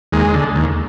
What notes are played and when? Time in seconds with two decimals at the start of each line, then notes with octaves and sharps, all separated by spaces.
0.13 D#2 G#3
0.34 D3
0.55 D#2